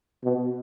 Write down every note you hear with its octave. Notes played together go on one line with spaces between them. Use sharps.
B2